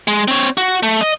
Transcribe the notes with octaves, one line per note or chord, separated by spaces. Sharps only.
G#3
C4 C#5
F#4
A3
D#5